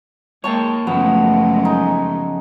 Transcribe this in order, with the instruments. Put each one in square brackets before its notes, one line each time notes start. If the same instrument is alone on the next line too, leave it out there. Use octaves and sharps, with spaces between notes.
[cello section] G#3 [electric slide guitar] A#3 C#5 [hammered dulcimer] G5 A5 C#6
[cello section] F#2 G#3 A3 [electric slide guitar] C#3 F3 F#3 [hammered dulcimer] B3
[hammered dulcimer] D#4 G#5